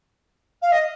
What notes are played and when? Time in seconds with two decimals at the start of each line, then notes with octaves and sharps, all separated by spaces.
0.62 F5
0.72 D#5